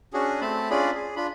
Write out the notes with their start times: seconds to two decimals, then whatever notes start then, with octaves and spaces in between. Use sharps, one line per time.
0.13 C#4 D4 F#4 G#4
0.41 A3 C4 A5 B5
0.70 C#4 D4 F4 G#4 D5 B5
0.95 G#4
1.16 D4 F4 B5